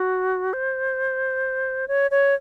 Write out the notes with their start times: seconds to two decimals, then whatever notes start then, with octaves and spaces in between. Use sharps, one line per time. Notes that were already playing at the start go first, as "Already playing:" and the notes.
Already playing: F#4
0.53 C5
1.88 C#5
2.11 C#5